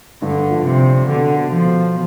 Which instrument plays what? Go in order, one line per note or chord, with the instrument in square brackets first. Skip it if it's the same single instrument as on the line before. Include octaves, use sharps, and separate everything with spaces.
[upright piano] G2 [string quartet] D3
[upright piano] F3
[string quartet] C3
[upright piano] C4
[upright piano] B2 [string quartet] D3
[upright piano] A4
[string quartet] F3
[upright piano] B2